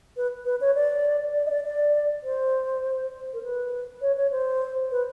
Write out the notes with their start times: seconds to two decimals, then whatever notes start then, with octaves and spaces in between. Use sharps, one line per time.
0.17 B4
0.45 B4
0.61 C#5
0.75 D5
1.34 D5
1.46 D#5
1.50 D5
1.64 D5
2.23 C5
3.33 A#4
3.43 B4
4.02 C#5
4.17 C#5
4.31 C5
4.91 B4